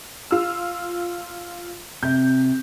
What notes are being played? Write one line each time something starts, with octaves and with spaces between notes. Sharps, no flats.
F4 E6
C3 G6